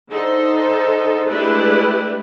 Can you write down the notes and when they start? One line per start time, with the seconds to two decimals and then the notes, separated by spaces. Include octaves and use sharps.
0.10 D3 D#4 A4 C5
1.28 G#3 A3 D4 E4 G4 B4